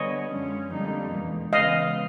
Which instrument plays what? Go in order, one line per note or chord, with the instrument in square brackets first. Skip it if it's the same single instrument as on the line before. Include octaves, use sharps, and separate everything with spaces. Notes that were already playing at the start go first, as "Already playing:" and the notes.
Already playing: [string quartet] D3 G3 B3 [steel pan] C#5 D#5
[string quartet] F#2 D3 F3 G#3 C#4
F2 D3 G3 A#3 D#4
E2 B2 G#3
[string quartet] C#3 E3 G#3 B3 [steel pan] D#5 F5